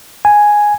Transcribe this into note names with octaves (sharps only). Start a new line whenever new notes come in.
G#5